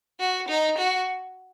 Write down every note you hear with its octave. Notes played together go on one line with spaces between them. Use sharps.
F#4
D#4
F#4